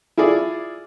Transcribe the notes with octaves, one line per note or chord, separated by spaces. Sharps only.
E4 F4 G#4 D5